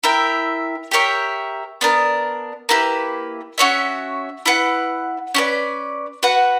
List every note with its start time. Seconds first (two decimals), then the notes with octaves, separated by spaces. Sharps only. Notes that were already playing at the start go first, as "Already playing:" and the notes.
0.04 E4 A#4 E5 G5
0.91 G4 A#4 C#5 E5
1.81 B3 D4 A#4
2.69 A#3 E4 G4 B4
3.58 C#4 F#4 C#5 E5
4.46 E4 B4 F#5
5.34 C#4 G4 B4 D5
6.23 F#4 B4 F#5